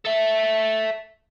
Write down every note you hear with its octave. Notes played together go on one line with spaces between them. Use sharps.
A4 E5